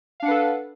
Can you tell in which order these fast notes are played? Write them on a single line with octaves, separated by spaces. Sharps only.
F5 D4 F#5 B4 A4